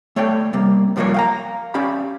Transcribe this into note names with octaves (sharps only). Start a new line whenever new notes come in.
A3 C#5 D5 G5
C3 G3 A#3
F#2 F3 G3 A#3 A#4 C#5
F5 G5 A#5
C#4 G4 D5 F5 B5